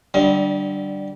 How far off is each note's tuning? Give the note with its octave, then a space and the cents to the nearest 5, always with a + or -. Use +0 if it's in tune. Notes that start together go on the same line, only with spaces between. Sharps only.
D3 +5 G3 -20 D#5 +35